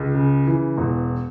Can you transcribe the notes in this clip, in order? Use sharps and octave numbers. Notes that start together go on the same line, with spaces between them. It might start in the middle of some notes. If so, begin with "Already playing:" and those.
Already playing: C#2
C#3
E3
E1